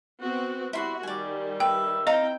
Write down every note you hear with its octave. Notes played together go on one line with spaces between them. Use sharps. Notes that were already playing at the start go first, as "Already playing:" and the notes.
B3 C4 F#4
G3 E4 F#4 C6
D#3 G3 D5 G#5
B4 E5 G5
C4 D#4 E4 D#5 F5 G5 A#5